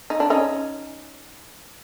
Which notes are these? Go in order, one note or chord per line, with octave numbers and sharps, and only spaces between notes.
D#4
D4
C#4 D#4